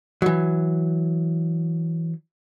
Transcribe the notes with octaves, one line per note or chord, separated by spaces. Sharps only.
E3 F#3